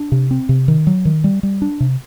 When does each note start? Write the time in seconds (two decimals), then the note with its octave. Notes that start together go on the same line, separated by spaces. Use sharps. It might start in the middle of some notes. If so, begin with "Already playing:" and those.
Already playing: D4
0.12 C3
0.31 C4
0.49 C3
0.68 D#3
0.87 F#3
1.05 D#3
1.24 G3
1.43 G3
1.62 D4
1.80 C3